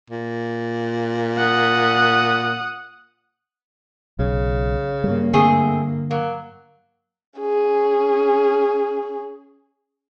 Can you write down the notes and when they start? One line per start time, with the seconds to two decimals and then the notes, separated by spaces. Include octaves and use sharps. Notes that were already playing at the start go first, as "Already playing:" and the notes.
0.10 A#2
1.38 F#5 D#6
4.19 B1 C#3
5.04 G2 G3 A#3
5.33 D3 A3 C4 G#4
6.11 F#3 A#3
7.40 C#4 G#4